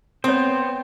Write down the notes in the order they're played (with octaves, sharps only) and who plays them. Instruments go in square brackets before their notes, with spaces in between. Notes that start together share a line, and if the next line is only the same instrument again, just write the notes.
[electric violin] B3 [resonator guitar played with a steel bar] C4 [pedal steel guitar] C5 [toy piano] C#5 D#6